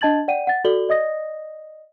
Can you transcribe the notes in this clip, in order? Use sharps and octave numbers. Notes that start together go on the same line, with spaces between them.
D4 D#5 A5 G#6 A6 F#7
D5 F#5 G5 D#7
F#5 A6
F#4 A4 D5 F#7 G7
D5 D#5 D#6 A#6